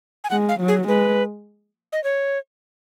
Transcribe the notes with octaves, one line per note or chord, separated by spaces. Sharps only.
G#5
G#3 F#5
F5
F#3
G#4
G#3 B4
D#5
C#5